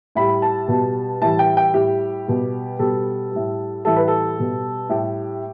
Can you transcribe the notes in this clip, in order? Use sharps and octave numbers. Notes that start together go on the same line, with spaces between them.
A2 G3 B5
A5
B2 G3
A2 E3 G3 A5
G5
G5
A2 G3 G4
B2 G3
B2 G3 A4
A2 G3
A2 E3 G3 A4
B4
A4
B2 G3
A2 G3 G4